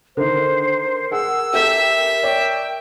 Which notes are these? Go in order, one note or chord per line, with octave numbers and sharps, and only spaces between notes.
D3 D#3 A#4 C5
G#4 F#5 E6
G4 A4 E5 G6
C#5 D5 G5